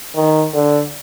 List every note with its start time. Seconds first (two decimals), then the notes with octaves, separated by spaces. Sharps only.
0.16 D#3
0.54 D3